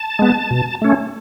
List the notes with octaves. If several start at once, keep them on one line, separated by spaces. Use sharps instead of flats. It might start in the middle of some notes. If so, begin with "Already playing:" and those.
Already playing: A5
G#3 B3
B2
A3 C#4